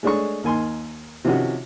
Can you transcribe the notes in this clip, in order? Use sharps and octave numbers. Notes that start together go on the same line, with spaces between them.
G#3 A3 D4 G#4 C#5 C#6
D#2 D#3 G#5 C6
C3 D#3 F3 C#4 F#4 G4